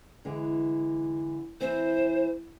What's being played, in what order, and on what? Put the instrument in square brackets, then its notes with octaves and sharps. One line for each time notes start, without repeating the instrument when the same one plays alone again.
[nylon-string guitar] D3 E3 G#3
[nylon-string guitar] E3 C4 [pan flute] C5